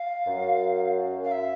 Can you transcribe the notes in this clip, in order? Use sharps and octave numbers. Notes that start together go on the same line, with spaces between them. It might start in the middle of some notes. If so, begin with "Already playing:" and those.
Already playing: F5
F#2
F5
E5